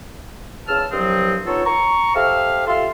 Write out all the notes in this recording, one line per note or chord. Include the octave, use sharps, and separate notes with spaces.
E2 C#3 A5 E6 F6
C2 G2 F3 F#3 C4 D#6
B3 C#4 D#4 F4 A4 C#5
A#5 C#6
G4 A4 C5 E5 F5
F4 G4 A4 E5 F5 C6